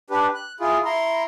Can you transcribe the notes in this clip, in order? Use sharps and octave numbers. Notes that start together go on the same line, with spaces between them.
D4 G4 B4
F#6
E4 F4 G#4
E4 A#5 C6